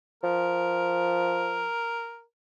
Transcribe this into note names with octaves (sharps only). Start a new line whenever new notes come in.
F3 A#4